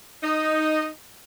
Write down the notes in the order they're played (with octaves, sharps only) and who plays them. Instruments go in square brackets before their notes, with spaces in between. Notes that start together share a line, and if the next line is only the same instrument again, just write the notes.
[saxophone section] D#4 D#5